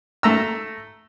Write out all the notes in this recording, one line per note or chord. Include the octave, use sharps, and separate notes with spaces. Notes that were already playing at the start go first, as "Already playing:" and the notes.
A3 A#5 E6